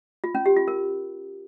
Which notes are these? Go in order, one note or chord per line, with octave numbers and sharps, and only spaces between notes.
F4
C#4
G4
F4
A#4